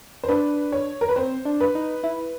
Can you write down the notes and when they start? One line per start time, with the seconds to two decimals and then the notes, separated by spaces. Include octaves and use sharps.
0.24 C5
0.28 D4 B4
0.72 C#5
1.01 A#4
1.09 B4
1.16 C4 C5
1.45 D4
1.60 B4
1.75 D#4
2.04 E4